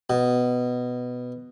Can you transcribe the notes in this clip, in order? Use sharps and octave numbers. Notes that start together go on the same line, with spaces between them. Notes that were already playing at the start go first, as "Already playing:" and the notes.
B2